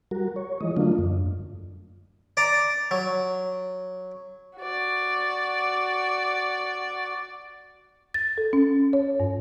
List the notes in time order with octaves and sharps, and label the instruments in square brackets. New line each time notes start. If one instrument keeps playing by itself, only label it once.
[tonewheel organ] G3 F#4 A#4
C#5
E3 F3 G#3 D#5
D3 F#3 A3 A#3 D4 F4
F#2
[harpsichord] D5 A#5
F#3
[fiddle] F#4 D5
[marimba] A6
A4
C#4
C#5
G2